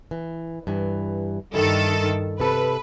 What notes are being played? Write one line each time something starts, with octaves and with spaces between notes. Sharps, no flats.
E3
G2 E3
G2 D#3 E4 A4
C3 A4 B4